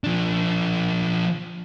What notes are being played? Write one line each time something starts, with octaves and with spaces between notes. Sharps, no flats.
F3 D4